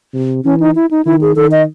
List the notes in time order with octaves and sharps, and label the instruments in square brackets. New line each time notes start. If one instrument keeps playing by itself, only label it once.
[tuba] C3
[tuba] E3 [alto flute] C#4
[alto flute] D#4
E4
D#4
[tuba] D#3 [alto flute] E4
[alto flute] G#4
[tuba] D#3 [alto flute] A4
[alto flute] D#5